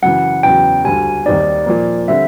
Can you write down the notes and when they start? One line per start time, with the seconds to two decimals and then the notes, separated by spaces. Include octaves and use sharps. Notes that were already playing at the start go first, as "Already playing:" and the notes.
0.02 F#2 C#3 E3 F#5
0.43 E2 C#3 F#3 G5
0.84 D2 D3 G3 G#5
1.25 D#2 D#3 G3 C4 D#4 D5
1.66 A#2 F3 A#3
2.08 D3 G3 C4 E5